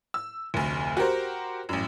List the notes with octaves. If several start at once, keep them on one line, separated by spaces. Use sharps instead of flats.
E6
F1 D2
F#4 G4 A#4 C5
A1 F#2